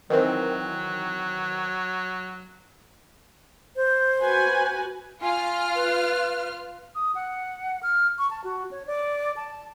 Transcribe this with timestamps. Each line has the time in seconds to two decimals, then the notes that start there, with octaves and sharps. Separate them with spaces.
0.10 D#3 E3 F#3 C4
3.76 C5
4.21 F#4 B4 G#5
5.22 F4 G#5 F6
5.75 B4
6.95 D#6
7.15 F#5
7.83 F6
8.18 C#6
8.31 A5
8.44 F#4
8.71 C#5
8.87 D5
9.36 A5